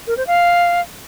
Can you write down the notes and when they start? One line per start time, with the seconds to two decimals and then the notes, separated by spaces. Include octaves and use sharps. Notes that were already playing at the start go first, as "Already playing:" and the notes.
0.07 A#4
0.17 C5
0.27 F5